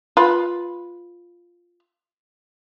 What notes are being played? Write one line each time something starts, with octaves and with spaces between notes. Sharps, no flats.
F4 B4